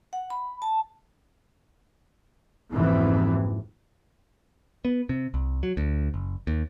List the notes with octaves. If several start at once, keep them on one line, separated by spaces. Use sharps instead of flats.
F#5
B5
A5
F#1 F2 G#2 C3 E3
B3
C3
C2
F#3
D2
F#1
D#2